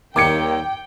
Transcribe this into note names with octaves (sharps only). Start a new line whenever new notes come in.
D#2 D#3 G3 A#3 G5 D6 G#6 C#7